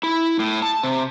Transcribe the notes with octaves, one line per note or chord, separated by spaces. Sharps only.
E4
A2
A5
C3